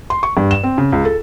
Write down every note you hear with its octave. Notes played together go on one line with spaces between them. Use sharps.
C6
C#6
G2
E7
C4
C#3
C#2
A4